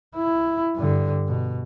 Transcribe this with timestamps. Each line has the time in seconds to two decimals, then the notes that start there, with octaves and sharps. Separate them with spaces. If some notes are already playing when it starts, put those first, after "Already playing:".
0.16 E4
0.76 G2 D3
1.28 B2